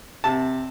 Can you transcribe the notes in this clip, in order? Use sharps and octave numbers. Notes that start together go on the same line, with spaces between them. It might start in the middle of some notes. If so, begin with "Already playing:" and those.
C3 A5